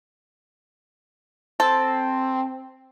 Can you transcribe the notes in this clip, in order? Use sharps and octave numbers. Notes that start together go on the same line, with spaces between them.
C4 A4